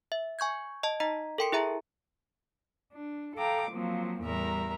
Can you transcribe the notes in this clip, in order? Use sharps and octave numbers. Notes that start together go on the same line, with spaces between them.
E5
G#5 C#6 G6 G#6
D#5 A5
D#4 D#5 A#5 B6
A4 A#4 G5 C6 C#7 D7
E4 G#4 E5 A#5
D4
A4 F5 G5 A#5 D6
F3 F#3 A#3 C4
E2 A2 G3 A#4 E5 A#5